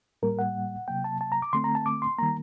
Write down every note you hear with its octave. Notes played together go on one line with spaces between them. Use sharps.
A2 G3 A#3 A#4
F#5
C3 F#3 A#3 G5
A5
A5
A#5
D6
D3 A3 C4 C6
A#5
A5
D6
C6
D#3 G3 A#3 A#5